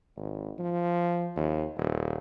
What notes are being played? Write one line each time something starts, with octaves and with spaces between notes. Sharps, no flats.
G#1
F3
D#2
D#1